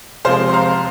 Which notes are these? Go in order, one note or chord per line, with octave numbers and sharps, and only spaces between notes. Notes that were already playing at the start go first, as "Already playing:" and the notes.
C3 F3 G#3 C4 C5 F5
C6
F5 A#5